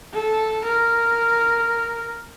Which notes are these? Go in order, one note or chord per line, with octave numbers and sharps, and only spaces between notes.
A4
A#4